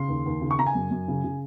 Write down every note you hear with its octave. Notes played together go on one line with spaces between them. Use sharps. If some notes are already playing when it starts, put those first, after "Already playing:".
Already playing: C#3 C6
D#2
D#2
C#3
C#6
C#3 A#5
G#5
F#2
F#2
C#3
C#3